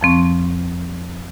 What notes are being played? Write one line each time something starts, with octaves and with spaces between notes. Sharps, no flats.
F2 F3 C4 C#6